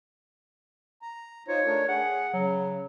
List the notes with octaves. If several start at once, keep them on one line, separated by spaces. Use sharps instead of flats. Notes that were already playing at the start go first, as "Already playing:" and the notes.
A#5
D#4 F4 C5 C#5
A3 D4 A#4
G#4 F#5
C#3 F#3